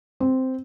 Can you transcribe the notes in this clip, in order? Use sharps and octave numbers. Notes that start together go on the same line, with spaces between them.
C4